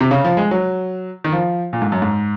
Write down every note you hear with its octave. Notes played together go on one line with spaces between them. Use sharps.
C3
C#3
F3
G#3
F#3
D#3
F3
A#2
G#2
F#2
G#2